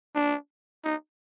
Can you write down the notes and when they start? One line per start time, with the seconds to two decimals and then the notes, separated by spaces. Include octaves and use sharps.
0.15 D4
0.84 D#4